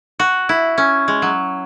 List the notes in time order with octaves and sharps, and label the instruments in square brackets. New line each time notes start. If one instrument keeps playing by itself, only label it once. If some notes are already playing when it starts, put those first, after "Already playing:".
[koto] F#4
E4
C#4
G#3
F#3